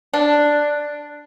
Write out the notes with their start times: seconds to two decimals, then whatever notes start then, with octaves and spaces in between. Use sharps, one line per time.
0.14 D4